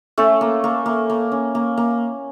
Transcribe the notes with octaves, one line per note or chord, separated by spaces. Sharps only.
A3 C#4 A4
A#3
A#3
A#3
A#3
C#4
A#3
A#3